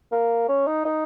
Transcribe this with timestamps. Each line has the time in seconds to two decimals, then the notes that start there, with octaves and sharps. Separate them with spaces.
0.12 A#3
0.49 C#4
0.67 D#4
0.85 D#4